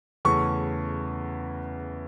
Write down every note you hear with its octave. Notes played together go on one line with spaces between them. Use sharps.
E2 C#3 E3 A3 C#4 C#6